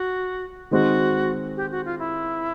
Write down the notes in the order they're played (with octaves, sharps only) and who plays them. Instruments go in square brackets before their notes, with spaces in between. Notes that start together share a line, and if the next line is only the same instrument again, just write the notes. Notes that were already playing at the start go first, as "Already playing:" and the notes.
Already playing: [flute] F#4
[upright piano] D#3 G#3 C4 [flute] F#4
[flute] G4
F#4
F4
E4